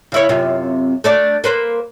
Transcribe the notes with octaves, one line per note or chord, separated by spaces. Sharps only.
C#3 E4 C#5
F#2 C3 F4
A3 D4 D5
A#3 B4 C5